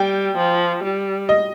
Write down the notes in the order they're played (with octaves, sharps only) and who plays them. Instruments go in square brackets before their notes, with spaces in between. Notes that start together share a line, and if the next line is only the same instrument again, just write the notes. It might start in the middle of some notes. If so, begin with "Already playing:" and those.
Already playing: [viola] G3 [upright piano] G5
[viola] F3
G3
[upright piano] D#5